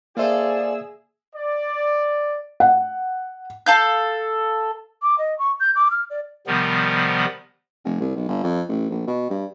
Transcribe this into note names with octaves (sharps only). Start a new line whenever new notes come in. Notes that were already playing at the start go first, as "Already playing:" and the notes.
A#3 F4 G#4 A4 C5 D5 E5 E6
D5
F#5
A4 F5 G6
D6
D#5
C#6
G6
D6
F6
D5
C3 D#3 F3 G3 B3
F1
C2
B1
G1
F2
A1
A#1
B2
G2